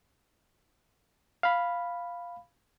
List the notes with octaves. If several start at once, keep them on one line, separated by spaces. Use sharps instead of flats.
F5 B5